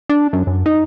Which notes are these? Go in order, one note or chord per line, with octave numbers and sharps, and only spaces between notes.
D4
F#2
F#2
D#4